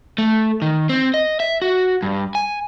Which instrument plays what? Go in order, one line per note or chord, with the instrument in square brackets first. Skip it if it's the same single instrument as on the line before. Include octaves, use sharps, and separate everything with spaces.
[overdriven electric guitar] A3
D#3
C4
D#5
E5
F#4
G2
G#5